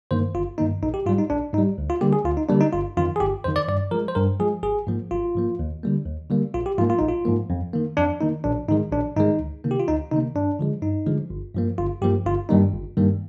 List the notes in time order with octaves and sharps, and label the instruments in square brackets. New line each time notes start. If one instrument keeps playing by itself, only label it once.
[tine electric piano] G2 D#3 A#3 C5
G1 F4
G2 D#3 A#3 D#4
A#1 D#4
G4
G#2 G3 F4
D#4
A#1 D4
G#2 D#4
G3
D2
F4
D3 G3 A#3 G4
G#4
D2 F4
D#4
D3 G3 A#3 D4
D#4
G1 F4
F2 D#3 F4
G#4
G1 G4
F2 D#3 C5
D5
G2 D5
F3 A#4
G#3
C5
G2 A#4
F3 G#3 G#4
G#1 G#4
G#2 F3 A#3
G#1 F4
G#2 F3 A#3
D#2
D3 G3 A#3
D#2
D3 G3 A#3
A#1 F4
G4
G#2 F3 A#3 F4
F4
A#1 D#4
F4
G#2 F3 A#3
F2
D#3 A#3
F2 D4
D#3 A#3 D#4
A#1 D4
G#2 D#3 G#3 D#4
A#1 D4
G#2 D#3 G#3 D#4
D2
C3 D#3 A#3
G4
F4
D2 D#4
C3 D#3 A#3 D#4
G2 D4
D3 F3 G#3
G2 D#4
D3 F3 G#3
G1
G2 F3 A#3
G1 F4
G2 F3 A#3 G4
G1 F4
G2 D#3 G3 A#3 D#4
G1
G2 D#3 G3 A#3